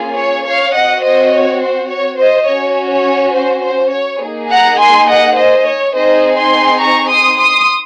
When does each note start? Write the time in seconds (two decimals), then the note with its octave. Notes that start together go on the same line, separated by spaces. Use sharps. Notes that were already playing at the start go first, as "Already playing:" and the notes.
Already playing: A#3 C#4 F4 G#4
0.17 C#5
0.46 C#5 F5
0.75 C4 F#4 D#5 F#5
1.04 C5 D#5
1.33 C#5
1.61 C5
1.90 C#5
2.19 C5 D#5
2.48 C#4 F#4 C#5
2.92 C#5
3.35 C5
3.64 C5
3.92 C#5
4.22 A#3 D#4 G#4
4.50 F#5 A#5
4.79 G#5 C6
5.07 D#5 F#5
5.37 C5 D#5
5.66 C#5
5.94 C4 D#4 G#4 C5 D#5
6.37 G#5 C6
6.81 A#5 C#6
7.09 C6 D#6
7.38 C6 D#6